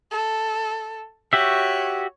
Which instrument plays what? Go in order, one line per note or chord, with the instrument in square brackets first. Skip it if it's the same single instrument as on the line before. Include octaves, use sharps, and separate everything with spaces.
[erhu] A4
[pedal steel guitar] F#4 G4 E5 [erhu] C#5